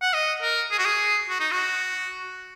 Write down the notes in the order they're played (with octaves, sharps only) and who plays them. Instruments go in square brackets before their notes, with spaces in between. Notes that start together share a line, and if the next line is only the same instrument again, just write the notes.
[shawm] F#5
D#5
A#4
G#4
F#4
G#4
F#4
D#4
F#4